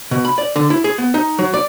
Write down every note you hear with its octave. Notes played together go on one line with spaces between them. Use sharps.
B2
B5
D5
D3
E4
G#4
B3
D#4
F#3
D5